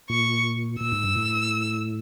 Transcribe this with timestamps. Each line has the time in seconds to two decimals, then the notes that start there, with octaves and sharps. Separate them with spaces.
0.10 A#2 C#6
0.80 A#2 E6
0.92 G#2
1.04 G2
1.16 A2